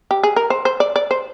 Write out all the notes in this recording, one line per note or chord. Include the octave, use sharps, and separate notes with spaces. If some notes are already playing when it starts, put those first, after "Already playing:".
G4
G#4
A#4
C5
C5
D5
D5
C5